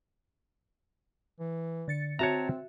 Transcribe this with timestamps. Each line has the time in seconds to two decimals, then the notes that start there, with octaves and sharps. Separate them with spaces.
1.40 E3
1.88 D3 A6 C#7
2.19 C4 F#4 C#5 E5 A5 A#5